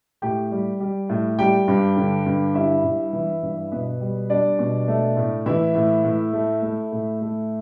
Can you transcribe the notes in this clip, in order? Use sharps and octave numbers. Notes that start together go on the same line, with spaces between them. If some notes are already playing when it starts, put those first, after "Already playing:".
A2 G4 G5
G3
G3
A2
G3 G4 G5
G2
D3
G2
G3 E4 E5
G2
E3
G2
B2 B3 B4
G3
G3 D4 D5
B2
A3
A2
E3 E4 E5
A2
A2
A3
A3
A2
A3